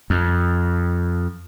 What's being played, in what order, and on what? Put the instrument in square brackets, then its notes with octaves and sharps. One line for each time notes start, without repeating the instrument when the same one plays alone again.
[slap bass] F2